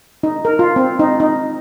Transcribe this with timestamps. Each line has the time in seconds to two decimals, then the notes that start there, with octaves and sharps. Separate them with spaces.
0.23 D#4
0.45 A#4
0.59 F4
0.76 C4
1.00 D#4
1.20 D#4